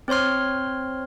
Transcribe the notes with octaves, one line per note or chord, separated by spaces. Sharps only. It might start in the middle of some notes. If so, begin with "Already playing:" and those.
C4 C5 C#5 C6 F6